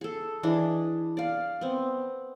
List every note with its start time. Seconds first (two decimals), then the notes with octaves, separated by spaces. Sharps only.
0.01 G#4 A4
0.43 E3 D4 G#4 D#5
1.17 D5 F5
1.61 B3 C4